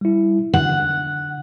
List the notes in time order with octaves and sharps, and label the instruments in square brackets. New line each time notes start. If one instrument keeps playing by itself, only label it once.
[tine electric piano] G3 E4
[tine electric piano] D3 [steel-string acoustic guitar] F#5